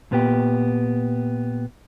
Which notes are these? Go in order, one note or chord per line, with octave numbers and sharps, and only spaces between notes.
A#2 B3 G4